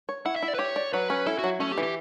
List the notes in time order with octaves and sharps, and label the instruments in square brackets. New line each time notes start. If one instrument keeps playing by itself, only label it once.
[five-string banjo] C#5
[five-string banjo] E4 [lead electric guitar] F#5
[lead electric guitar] E5
[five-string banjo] E4
[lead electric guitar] D5
B4
[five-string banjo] G4 [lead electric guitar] C#5
[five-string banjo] D5
[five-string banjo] F#3 [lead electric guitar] B4
[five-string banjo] C#4
[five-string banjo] E4 [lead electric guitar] A4
[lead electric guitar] F#4
[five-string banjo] F#3
[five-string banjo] A3 [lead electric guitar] C#4
[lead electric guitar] G4
[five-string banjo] E3
[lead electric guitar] G4